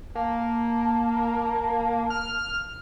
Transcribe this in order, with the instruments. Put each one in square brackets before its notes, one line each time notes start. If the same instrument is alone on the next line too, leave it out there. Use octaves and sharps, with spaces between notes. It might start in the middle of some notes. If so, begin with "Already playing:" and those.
[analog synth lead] A#3 [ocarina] A5
[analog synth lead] F6